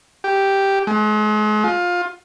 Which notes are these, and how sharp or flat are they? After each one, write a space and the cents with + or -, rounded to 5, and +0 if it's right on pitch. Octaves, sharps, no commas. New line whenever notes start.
G4 +0
G#3 +40
F4 +20